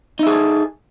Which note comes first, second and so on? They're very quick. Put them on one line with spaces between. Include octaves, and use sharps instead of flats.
D#4 E5 G#4 A4